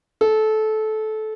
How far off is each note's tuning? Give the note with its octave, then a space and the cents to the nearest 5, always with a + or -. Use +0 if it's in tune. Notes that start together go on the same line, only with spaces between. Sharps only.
A4 -20